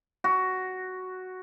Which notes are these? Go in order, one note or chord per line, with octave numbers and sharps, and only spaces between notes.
F#4